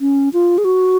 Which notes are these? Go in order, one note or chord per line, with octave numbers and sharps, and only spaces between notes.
C#4
F4
G#4
F#4